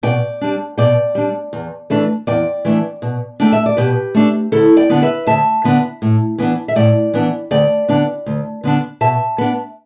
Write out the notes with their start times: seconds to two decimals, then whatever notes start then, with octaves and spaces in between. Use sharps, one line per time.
0.03 B2 D5 G5
0.41 G3 D4
0.78 B2 D5 G5
1.15 G3 D4
1.53 E2
1.90 E3 A3 D4
2.27 E2 D5 G5
2.65 E3 A3 D4
3.02 B2
3.40 A3 D4 G5
3.52 E5
3.66 D5
3.77 B2 G4 B4
4.15 A3 D4
4.52 D2 E4 A4
4.77 D5 G5
4.90 D3 B3 D4
5.02 B4 E5
5.27 D2 E5 A5
5.64 D3 B3 D4
6.02 A2
6.38 E3 B3 D4
6.68 E5
6.76 A2 D5 G5
7.14 E3 B3 D4
7.51 D2 D5 G5
7.89 D3 B3 D4
8.26 D2
8.64 D3 B3 D4
9.01 B2 E5 A5
9.38 B3 D4